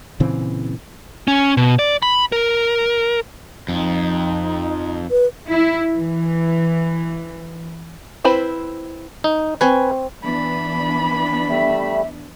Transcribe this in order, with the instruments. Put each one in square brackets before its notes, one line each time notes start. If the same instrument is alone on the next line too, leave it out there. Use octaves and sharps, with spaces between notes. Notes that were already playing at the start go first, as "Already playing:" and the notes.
[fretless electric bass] A#2 C#3 E3 C4
[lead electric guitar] C#4
B2
D5
B5
A#4
[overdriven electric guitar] F2 [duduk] D#4
[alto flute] B4
[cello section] E4
E3
[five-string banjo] C4 E4 B4 C5 B5
[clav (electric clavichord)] D#4
[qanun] C4 C#6 [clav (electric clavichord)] B4 G#5
[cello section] E3 B3 D4 [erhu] B5
[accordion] G3 A3 [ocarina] E5